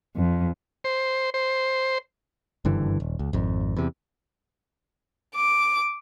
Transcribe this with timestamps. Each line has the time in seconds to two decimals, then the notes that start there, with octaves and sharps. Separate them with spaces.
0.16 F2
0.84 C5
1.34 C5
2.65 F#1 G2 D3 E3
3.00 D#1
3.19 C#2
3.33 G#1 F2
3.77 E2 C3
5.34 D6